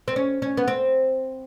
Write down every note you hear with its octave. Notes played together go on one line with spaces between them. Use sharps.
C4
C#4
C#4
B3
C4